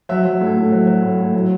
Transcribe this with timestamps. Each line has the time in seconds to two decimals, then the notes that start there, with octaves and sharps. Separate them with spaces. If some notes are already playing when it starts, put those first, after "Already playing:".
0.09 F#3 E5
0.25 F#3
0.41 A2
0.56 A2
0.72 F#3
0.87 F#3
1.03 A2
1.18 A2
1.34 F#3